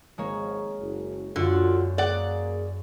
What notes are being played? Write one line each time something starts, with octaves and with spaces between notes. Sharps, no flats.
G#1 G#3 A#3 C#5
F#1
F#2 D3 F4 F#4
A#3 G#4 D5 F#5